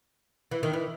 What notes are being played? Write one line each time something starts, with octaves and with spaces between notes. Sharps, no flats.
E3
D#3
E3